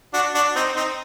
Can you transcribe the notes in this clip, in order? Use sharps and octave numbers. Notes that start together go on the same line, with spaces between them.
D4 F#4
D4 F#4
C4 D#4
C4 D#4